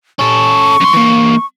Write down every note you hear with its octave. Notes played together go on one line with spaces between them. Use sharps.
C#4 A4 C#6
F#2 C6
E3 A#3